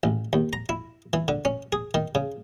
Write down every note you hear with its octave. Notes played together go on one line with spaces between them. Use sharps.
A1
D#2
A#5
E4
E3
D3
C#4
G#4
D#3
C#3